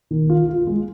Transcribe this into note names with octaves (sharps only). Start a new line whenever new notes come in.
D#3
F4
F4
G#3